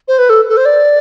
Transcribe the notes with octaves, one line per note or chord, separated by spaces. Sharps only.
C5
B4
A4
A4
C5
D5